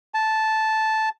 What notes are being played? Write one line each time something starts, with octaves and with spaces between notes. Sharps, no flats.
A5